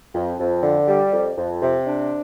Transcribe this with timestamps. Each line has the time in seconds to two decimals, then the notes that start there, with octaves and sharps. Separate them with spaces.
0.15 F2
0.39 F2
0.63 D3
0.88 G3
1.12 F2
1.37 F2
1.62 C3
1.87 D4